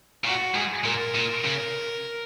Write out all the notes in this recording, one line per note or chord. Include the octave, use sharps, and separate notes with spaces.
A#2 F#4
G#2 G#4
A#2 A#4
A#2
C#3